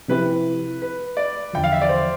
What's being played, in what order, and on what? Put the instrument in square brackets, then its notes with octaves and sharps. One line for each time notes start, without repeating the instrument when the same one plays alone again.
[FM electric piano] C3 F3 C4 E4 G4 [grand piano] B4
[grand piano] B4
D5
[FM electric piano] E2 D3 F3 [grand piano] G5
[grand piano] F5
E5
D5
C5